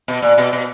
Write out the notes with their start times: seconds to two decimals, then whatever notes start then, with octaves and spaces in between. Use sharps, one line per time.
0.08 B2
0.22 A#2
0.38 B2
0.53 B2